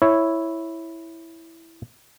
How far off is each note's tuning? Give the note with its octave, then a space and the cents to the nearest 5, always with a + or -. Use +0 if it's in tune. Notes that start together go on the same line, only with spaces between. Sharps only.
E4 +0 C#5 -5